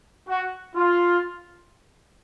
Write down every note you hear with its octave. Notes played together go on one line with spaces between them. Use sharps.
F#4
F4